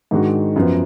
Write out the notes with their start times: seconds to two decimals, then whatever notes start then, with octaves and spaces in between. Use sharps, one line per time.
0.11 G#2 D#3 G#3 D4 F#4
0.56 F#2 F3 B3